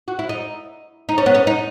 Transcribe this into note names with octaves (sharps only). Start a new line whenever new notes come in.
F#4
E4
D#4
D#4
C#4
B3
C#4
D#4